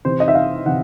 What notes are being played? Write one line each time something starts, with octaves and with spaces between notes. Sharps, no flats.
C3 E3 C5
D#5
E5
F5
C3 E3 F#5